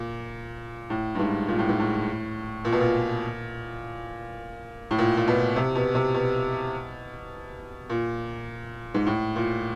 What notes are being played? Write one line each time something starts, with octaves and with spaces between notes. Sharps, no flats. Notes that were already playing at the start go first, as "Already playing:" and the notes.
Already playing: A#2
A2
G2
G#2
A#2
A2
G#2
A2
A#2
B2
A#2
A2
A#2
A#2
B2
C3
B2
C3
B2
A#2
G#2
A2
A#2